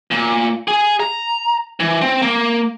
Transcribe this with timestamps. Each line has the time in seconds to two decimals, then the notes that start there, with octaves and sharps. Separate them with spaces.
0.11 A#2
0.68 G#4
1.00 A#5
1.80 E3
2.02 C4
2.22 A#3